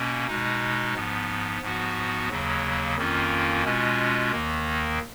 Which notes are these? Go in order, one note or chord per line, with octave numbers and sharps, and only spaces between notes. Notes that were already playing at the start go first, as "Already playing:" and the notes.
Already playing: B2 A#3 C#4
B2 G#3 D#4
G#2 F3 B3
G#2 F3 B3 F#4
D#2 C#3 F#3 A#3
F2 D#3 A#3 C#4 F4
B2 G#3 C#4 F4
D#2 D#3 A#3